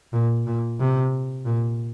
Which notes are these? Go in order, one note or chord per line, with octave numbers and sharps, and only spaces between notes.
A#2
A#2
C3
A#2